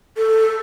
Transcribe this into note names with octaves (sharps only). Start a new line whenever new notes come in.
A4